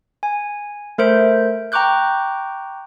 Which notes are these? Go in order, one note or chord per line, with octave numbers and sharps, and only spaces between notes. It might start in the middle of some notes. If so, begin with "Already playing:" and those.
G#5
A3 A#4 C5 E5 G6 D7
G5 A#5 C#6 D6 F#6 G6